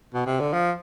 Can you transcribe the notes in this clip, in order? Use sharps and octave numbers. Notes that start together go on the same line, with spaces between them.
B2
C3
D3
F3